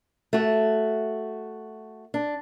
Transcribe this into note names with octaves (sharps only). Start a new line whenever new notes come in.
A3 F#4
D4